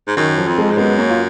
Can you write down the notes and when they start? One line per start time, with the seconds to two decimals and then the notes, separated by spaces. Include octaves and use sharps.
0.07 G#2
0.17 F#2 D#3
0.38 F3
0.47 F2
0.58 F3 G#3
0.71 G#2
0.77 F#2 G#3 B3
0.98 A#3 C#4
1.10 F4